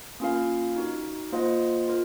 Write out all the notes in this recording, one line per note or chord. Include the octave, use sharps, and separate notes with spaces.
A#3 C#4 F4 A#4 F5
D#4 F#4 A#4
A#3 F4 C5 D#5 F#5
F4 A#4